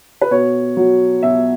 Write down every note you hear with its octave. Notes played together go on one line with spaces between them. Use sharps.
B4
B2 C#5
F#3
B2 E5